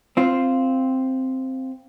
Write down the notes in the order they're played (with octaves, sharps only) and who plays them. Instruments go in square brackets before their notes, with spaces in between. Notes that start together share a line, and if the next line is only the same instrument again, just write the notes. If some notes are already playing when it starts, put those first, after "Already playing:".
[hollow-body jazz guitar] C4 F4